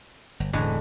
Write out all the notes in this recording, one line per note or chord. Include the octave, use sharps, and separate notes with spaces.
G1
E1 A2 D3 E3 G#3